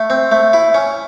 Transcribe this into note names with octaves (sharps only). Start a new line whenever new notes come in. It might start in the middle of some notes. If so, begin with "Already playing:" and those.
Already playing: A3
C4
A3
E4
C#4